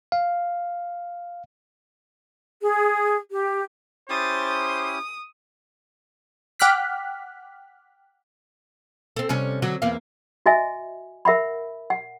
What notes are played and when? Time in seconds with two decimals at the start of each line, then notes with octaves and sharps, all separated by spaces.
0.12 F5
2.62 G#4
3.30 G4
4.10 C#4 E4 G4 C5 D#6 A6
4.46 D#6
6.60 F#5 G5 D6 F6 F#6 B6
9.16 C4 A4
9.29 C3 G3 C#4
9.62 D3 F#3 F#4
9.82 E2 A#3 F5
10.46 F#4 D#5 E5 G#5
11.25 A#4 E5 F#5 B5
11.90 F#5